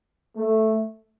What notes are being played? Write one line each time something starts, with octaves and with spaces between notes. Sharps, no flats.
A3